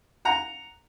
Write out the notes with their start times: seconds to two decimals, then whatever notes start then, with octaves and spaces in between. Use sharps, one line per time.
0.25 F#5 A#5